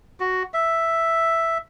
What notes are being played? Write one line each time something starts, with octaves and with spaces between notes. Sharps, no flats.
F#4
E5